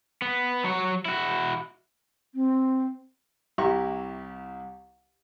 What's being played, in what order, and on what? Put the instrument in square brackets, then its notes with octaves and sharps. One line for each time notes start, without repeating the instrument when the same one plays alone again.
[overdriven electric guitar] B3
F#3 C#5
E4 F#4
[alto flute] C4
[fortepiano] C2 E4 G4 A#5 C#6